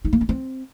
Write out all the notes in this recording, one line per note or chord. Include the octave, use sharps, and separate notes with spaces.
D#4
A#3
C#4
C4